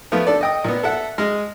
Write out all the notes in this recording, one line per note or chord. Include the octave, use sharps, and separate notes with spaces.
F3 A3 B3 F4
D4 A4 D5
D#5 G5 D#6
A#2 B3
A4 E5 F#5
G#3 D#5 F6